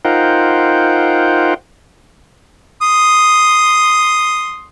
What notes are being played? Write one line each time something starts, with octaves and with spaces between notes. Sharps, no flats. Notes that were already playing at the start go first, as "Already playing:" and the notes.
D#4 F4 A#4 C5 F#5 G5
C6 D#6